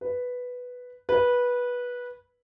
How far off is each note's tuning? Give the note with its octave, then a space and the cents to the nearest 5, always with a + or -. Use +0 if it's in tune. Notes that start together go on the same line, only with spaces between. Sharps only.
B4 +0
B4 -15